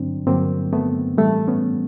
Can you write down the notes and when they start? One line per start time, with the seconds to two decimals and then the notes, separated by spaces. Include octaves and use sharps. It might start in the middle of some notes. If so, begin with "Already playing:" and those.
Already playing: G2 D3 F#3 C4 D4
0.26 G2 D3 F#3 A#3 C4
0.73 A3 B3
1.18 A2 E3 G3 A3
1.47 B3 C#4